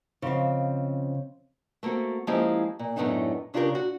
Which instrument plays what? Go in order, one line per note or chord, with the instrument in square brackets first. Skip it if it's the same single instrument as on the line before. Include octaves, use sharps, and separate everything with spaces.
[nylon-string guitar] C#3 F3 C4 D#5 F5
A3 A#3 C4 F#4
F3 G#3 A#3 C#4 E4 G4
A#2
F#2 A2 A3 B3 D4 D#4
C#3 D4 F4 G4 G#4 A#4
F#4